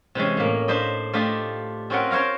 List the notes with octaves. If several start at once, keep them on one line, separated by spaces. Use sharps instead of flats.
C3 E3 G#3 C#4
A2 A#3
D4 C5 D#5 B5
A3 D4 F4 G4 D#5
C4 C#4 F4 A#4 B4 F#5
A#4 C5 C#5 F5 A#5